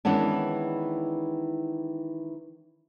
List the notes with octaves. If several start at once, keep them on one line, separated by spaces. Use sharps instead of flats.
D#3 E3 G#3 B3 C#4 D4